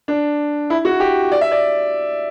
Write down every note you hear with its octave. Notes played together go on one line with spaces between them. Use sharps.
D4
E4
F#4
G4
D5
E5
D5